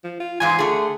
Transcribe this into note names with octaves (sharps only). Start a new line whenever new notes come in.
F3
F4
E2 G#2 F4 G#5
D3 A3 G#4